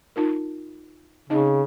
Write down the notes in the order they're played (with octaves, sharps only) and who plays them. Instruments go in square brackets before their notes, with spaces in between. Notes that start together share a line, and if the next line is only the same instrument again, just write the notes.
[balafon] D#4 F4 A#4
[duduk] C#3 [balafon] C4 D#4 D#5